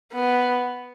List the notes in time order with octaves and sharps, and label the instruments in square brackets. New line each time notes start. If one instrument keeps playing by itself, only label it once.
[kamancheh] B3